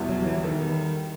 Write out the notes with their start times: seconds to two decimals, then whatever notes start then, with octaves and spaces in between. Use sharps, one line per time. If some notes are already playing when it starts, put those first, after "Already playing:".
Already playing: E2 B2 G3 B3 E4
0.09 F#3
0.26 E3
0.38 E3
0.44 D#3 G3 B3 D#4 A4